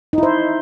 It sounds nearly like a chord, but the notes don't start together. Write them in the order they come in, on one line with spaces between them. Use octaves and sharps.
D#4 E4 C5